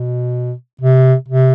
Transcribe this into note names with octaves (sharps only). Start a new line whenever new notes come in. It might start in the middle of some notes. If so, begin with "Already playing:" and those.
Already playing: B2
C3
C3